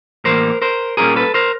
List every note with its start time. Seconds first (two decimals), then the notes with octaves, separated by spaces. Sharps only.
0.24 A2 E3 G3 A#3 A#4 C5
0.62 A#4 C5
0.97 A#2 G3 A#3 C#4 F4 G#4 A#4
1.16 A4 B4
1.34 A#4 C5